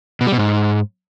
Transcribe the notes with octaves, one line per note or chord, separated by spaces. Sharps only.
B2
G3
B2
G#2